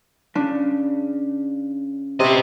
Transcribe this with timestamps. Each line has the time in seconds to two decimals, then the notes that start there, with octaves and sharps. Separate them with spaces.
0.35 C#3 D4
2.20 C3 B4 D#5